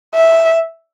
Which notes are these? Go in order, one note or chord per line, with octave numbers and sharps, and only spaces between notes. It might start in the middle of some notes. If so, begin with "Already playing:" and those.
E5